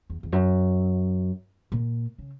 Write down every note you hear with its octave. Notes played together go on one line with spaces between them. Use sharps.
E2
E2
F#2
A#2
C#3